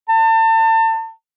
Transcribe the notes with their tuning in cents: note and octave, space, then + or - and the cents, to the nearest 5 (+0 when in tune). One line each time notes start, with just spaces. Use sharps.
A5 +35